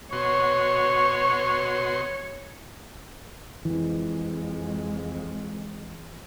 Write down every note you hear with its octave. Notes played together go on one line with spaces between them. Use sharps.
B2 F#4 C#5 C6 C#6
F2 E3 G#3